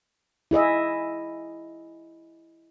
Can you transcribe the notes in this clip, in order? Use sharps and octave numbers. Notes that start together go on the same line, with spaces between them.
E4 G#4 D#5 E5